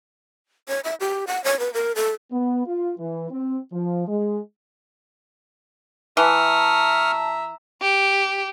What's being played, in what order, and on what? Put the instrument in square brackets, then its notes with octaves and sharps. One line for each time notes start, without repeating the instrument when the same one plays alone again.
[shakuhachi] C#5
E5
G4
F#5
C#5
B4
A#4
A4
[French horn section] B3
F4
E3
C4
F3
G#3
[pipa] E3 [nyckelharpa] E5 A#5 [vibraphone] A5 [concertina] C#6 D#6 F6
[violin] G4